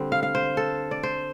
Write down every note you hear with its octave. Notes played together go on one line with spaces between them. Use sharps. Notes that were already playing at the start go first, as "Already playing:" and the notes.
Already playing: D3 G3 C4
F5
F5
C5
A4
D5
C5